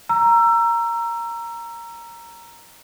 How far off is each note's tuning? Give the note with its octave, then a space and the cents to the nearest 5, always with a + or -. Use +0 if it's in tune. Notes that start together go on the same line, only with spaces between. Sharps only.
A#5 +0 E6 +25